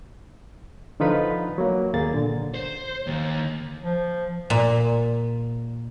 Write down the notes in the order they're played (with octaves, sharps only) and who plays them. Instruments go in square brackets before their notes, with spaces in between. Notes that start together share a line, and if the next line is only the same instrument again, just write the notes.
[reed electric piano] D3 F3 D#4 F4 B4 B5
F#3 A#3
D#2 A#3 G#4 A6
A#2 D3
[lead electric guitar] C5
D#2
[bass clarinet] F3
[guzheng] A#2